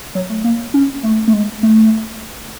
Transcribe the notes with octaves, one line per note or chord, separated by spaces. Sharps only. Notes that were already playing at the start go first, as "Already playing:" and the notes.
F#3
A3
A#3
C#4
A3
A3
G#3
A3